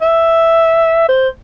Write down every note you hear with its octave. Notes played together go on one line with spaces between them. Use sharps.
E5
C5